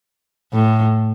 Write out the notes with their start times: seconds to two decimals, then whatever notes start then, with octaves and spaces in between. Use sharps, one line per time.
0.53 A2